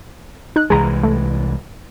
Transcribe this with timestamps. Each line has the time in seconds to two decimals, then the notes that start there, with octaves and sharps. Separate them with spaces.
0.56 D#4 F#6
0.70 C2 E3 G#3 G#4 A#5
1.03 A3